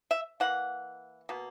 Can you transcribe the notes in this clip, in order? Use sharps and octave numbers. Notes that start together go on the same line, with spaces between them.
E5
E3 A#3 F#5
B2 A#3